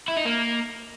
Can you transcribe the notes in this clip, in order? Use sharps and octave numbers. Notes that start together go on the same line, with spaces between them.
E4
D#4
A#3